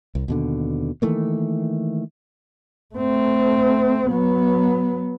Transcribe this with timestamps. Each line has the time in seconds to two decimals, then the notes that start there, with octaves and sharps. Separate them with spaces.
0.15 C2
0.28 D#2 B2 D3
1.02 D#3 E3 A3 A#3
2.95 A3 C4
4.09 F#3 B3